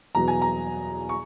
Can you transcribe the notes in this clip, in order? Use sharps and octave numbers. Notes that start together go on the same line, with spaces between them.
E2 B2 F#3 B3 A#5
G#5
A#5
C#6